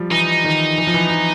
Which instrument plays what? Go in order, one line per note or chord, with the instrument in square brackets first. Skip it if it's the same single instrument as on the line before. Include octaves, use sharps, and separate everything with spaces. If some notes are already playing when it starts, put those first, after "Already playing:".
Already playing: [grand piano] F3 G3
[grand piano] E3 [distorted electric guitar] D#4
[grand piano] D#3
E3
F3
E3
F3